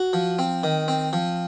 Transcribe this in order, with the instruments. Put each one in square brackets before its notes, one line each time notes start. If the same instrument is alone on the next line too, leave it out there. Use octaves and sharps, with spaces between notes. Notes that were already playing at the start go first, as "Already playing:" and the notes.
Already playing: [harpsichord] F#4
F3
C4
D#3
C4
F3